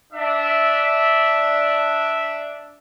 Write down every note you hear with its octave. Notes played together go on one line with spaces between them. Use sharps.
D4 E5